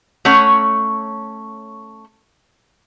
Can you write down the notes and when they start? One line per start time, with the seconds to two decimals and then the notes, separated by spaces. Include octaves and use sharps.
0.25 A3 C#4 C#5 F#5